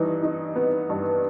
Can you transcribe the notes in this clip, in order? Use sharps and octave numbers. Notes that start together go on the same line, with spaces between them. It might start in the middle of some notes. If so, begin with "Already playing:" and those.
Already playing: G2 E3 D#4
D#4
B3
G2